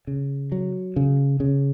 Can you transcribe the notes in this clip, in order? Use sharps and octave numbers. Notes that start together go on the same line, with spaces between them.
C#3
F#3
C#3
C#3